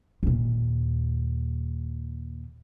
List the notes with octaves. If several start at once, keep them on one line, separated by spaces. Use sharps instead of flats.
D#2 A#2